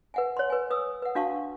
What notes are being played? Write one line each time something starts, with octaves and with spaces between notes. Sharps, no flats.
B4 F#5 G#5
C#5 C6
B4 G#5
B4 D#6 E6
B4 F#5
D4 F#4 F5 A5 C#6